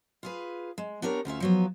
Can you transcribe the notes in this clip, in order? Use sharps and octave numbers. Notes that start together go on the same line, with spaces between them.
F4 G#4 B4
G#3
B3 D4 G4 A#4 C#5
D2 C#4 F4 E5
F3 F#3 B3